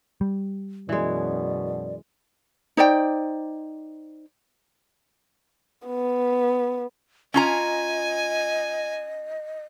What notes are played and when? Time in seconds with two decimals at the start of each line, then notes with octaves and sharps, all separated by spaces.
0.21 G3
0.89 F#2 B2 E3 G#3 D5
2.77 D#4 C5 D5 G5
5.87 B3
7.34 C#4 F4 D#5 G#5 A#5